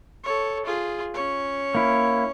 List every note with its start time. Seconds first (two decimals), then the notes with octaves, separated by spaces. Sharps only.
0.24 A4 C#5
0.66 F4 G#4
1.14 C#4 C#5
1.75 A#3 E4